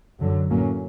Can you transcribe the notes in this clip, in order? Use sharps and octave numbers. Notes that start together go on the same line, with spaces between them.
F#2 D3 F#3
A2 F#3 A#3 C#4